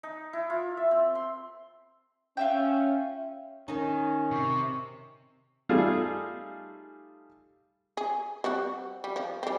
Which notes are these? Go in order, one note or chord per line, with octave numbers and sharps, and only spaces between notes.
D#4
E4
F4
E5
C4
C6
C#4 F4 E5 G5
D#3 C#4 D#4
C3 C#6
G3 A3 D#4 F4 G#4 A4
G#4
G3 C4 F#4
G3
F3
G3 C4